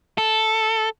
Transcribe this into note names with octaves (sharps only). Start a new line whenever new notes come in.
A4